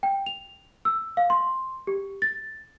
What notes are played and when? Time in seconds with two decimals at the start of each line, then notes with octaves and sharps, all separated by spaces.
0.03 G5
0.26 F7
0.85 E6
1.17 F5
1.30 C6
1.87 G4
2.22 A6